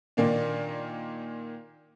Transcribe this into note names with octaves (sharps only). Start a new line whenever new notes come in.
A#2 D#3 A#3 D4